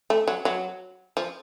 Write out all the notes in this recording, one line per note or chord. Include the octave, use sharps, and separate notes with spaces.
A3
F#3
F#3
F3